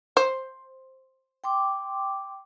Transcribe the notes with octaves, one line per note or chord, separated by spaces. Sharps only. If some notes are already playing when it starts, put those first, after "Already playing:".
C5
G5 C6 D6